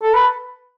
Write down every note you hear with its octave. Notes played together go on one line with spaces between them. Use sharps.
A4
B4